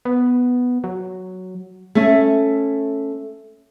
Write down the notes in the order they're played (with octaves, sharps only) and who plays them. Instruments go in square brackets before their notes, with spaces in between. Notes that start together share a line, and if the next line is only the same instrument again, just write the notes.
[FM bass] B3
F#3
[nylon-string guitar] A3 C#4